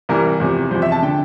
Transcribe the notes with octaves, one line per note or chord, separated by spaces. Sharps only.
C2 C3 E3 A#4
E2 C3 F3
E2 C3 F3 C5
E5
A5
D3 G5